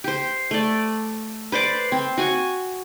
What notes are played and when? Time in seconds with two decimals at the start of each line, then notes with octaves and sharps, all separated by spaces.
0.04 G4 C5
0.51 A3 D5
1.52 B4 C5 D5 D6
1.92 C4
2.18 F#4 G#5 C#6